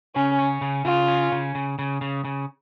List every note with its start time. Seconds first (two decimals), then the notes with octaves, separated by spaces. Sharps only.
0.15 C#3 C#4
0.39 C#4
0.61 C#3
0.85 C#3 F4
1.08 C#4
1.32 C#3
1.55 C#3
1.79 C#3
2.01 C#3
2.25 C#3